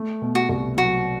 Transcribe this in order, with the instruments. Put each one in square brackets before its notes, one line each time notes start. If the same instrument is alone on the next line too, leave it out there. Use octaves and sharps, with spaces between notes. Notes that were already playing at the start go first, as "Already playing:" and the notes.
Already playing: [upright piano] A3
B2
[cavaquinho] F#4
[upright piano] C2
[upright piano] F#3 [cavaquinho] F#4